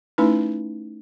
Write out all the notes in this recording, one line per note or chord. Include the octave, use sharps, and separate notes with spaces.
A3 C#4 D#4 E4 B4